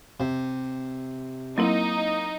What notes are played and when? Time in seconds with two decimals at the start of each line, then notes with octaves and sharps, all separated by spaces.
0.20 C3
1.58 F#3 A#3 C4 D#4 E4